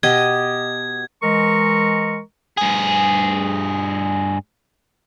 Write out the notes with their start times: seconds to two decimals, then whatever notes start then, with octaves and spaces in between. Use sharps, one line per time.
0.03 B2 G4 D#5 G#6
1.23 E3 G#3 A#4 D#5 A#5 C#6
2.58 G2 G#4